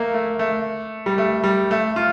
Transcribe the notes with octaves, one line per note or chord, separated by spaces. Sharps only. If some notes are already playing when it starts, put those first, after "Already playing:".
Already playing: A3 A#3
A3
A3
G3
A3
G3
A3
F4